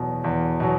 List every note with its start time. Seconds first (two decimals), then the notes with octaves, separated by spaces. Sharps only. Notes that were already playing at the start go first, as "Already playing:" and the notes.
Already playing: E2 B2 F#3
0.24 E2
0.60 B2 F#3